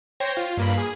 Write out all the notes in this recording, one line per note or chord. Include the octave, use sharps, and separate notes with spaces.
C5 C#5 G5 G#6 A#6
F4
G2 A#3 B5
G#4